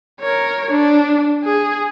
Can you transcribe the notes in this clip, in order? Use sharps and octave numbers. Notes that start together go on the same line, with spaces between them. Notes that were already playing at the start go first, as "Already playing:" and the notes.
A#4 C#5
D4
G#4